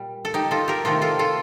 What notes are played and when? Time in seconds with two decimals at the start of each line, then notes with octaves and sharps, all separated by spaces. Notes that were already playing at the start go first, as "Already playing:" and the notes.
Already playing: A#2 G3
0.25 A4
0.34 D#4 G4
0.51 F4 A4
0.68 G4 A#4
0.85 C3 D#3 A3 F4 A4
1.02 F4 A4
1.19 F4 A4